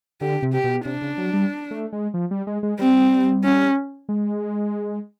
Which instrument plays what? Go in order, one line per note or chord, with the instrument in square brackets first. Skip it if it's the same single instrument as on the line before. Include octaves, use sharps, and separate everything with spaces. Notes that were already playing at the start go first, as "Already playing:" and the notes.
[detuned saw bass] D3 [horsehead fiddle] G4
[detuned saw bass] C3
[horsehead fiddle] G4
[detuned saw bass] B2
[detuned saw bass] C3 [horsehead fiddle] D4
[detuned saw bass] C#3
F#3
G3
A3
G#3
F3
G3
G#3
G#3
[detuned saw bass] G3 [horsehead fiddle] C4
[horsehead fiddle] C#4
[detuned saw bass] G#3